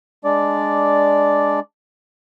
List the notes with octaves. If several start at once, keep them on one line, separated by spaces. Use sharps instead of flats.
G#3 D4 D5